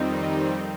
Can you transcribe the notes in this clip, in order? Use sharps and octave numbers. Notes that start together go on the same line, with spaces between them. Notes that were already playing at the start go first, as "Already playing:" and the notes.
Already playing: F2 D#3 G3 C4 D#4
D#5